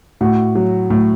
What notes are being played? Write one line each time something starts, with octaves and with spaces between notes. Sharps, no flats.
A2 F#4
F#3
A2